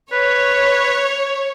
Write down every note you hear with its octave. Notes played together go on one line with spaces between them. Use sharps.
B4 C#5